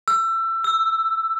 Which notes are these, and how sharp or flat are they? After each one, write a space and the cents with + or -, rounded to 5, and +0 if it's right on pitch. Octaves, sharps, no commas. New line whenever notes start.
E6 +25
E6 +5